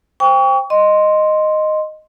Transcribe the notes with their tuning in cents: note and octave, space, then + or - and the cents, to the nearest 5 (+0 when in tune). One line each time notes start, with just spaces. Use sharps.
C5 +0 G5 +25 C#6 +35
D#5 -5 C6 +0